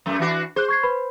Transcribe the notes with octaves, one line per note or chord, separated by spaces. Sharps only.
F#2 A3
E3 D4 F#4
G#4 C5 F#6
C#6 G#6 C7
B4 B5